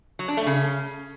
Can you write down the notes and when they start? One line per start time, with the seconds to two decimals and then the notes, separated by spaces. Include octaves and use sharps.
0.19 F#3
0.28 D4
0.37 A3
0.46 C#3